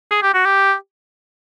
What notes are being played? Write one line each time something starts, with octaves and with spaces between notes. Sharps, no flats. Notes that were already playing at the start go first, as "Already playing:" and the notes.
G#4
G4
F#4
G4